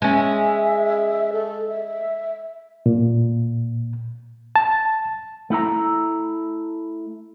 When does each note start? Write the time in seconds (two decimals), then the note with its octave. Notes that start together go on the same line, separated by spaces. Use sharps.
0.02 G#3 C#4 E5
1.33 A4
1.69 E5
2.86 A#2
4.56 A5
5.50 A3 E4 E5 A#5